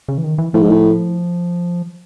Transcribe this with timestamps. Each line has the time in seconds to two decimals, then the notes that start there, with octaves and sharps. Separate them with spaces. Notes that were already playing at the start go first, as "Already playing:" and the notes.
0.08 C#3
0.18 E3
0.24 D#3
0.38 E3
0.54 A2 F3
0.62 G#2
0.70 A2